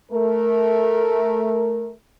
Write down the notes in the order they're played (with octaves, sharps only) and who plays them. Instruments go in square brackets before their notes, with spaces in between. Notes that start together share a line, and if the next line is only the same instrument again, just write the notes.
[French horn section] A3 A#4